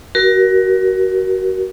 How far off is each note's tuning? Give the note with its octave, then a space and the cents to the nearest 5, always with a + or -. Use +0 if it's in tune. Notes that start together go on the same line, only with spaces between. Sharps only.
F#4 +25 A#4 +20